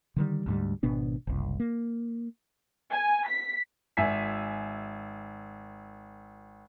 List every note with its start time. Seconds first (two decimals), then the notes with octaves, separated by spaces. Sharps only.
0.16 D3 D#3 G3
0.46 D2 G#2 G3
0.83 G#1 B2 B3 D4
1.27 F#1 C2
1.60 A#3
2.92 G#5
3.27 B6
3.97 G#1 E5 G#5 B6